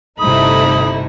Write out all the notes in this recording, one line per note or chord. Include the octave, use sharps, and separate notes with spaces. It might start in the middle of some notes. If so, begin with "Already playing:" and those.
G1 C3 A3 D#4 E4 B5 D#6